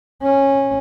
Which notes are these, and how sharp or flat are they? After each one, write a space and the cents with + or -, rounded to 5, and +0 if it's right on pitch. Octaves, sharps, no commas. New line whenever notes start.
C#4 -15